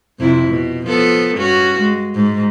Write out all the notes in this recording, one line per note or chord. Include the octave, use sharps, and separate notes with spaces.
F2 C3 E4
B2
F3 B3 A4
G2 C#4 F#4
G#3
G#2